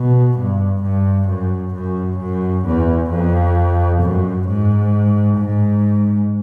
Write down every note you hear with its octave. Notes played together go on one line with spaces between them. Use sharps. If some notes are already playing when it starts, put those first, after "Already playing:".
Already playing: B2
G2
G2
F#2
F#2
F#2
E2
F2
F#2
G#2
G#2